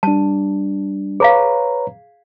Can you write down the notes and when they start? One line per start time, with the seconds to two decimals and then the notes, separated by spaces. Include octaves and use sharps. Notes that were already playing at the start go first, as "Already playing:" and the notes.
0.03 G3 D4 A5
1.20 G#4 B4 C#5 F5 A#5